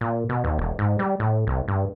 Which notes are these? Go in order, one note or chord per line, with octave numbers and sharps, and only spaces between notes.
A#2
B2
D#2
E1
G#2
G3
A2
C2
G2